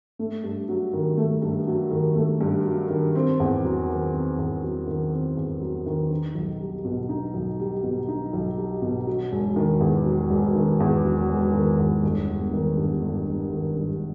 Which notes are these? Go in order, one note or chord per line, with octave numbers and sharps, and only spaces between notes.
A3
G2
F#3
D#3
A3
G2
F#3
D#3
A3
G2
F#3
D#3
C4
E2
F#3
D#3
C4
E2
F#3
D#3
C4
E2
F#3
D#3
D#4
B1
G3
B2
D#4
B1
G3
B2
D#4
B1
G3
B2
F#3
E1
D#3
E2
F#3
E1
D#3
E2
F#3
E1
D#3
E2
G1
G1
D#3
G2
G1
G1
D#3
G2